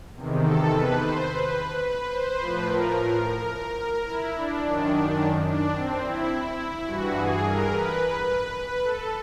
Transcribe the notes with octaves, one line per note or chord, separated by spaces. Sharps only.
E2 C3 D#3
A4
B4
C5
B4
B4
C5
A2 F3 B4
A#4
E4
D4
F#2 D#3
D4
C4
E4
G2 E3 F#4
G#4
A#4
B4
B4
A4